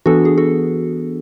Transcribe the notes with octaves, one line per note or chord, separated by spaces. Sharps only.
E3 B3 D4 F#4 A4
G#4
F#4 A4